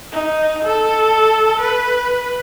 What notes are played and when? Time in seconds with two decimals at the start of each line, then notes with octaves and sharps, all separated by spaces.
0.12 D#4
0.64 A4
1.61 B4